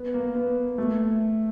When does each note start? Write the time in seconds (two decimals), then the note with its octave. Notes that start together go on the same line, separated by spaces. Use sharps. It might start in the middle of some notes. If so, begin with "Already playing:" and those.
Already playing: B3
0.14 A#3
0.35 B3
0.78 A3